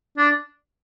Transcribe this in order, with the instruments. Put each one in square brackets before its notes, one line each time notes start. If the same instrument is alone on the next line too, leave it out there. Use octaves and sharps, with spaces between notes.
[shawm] D4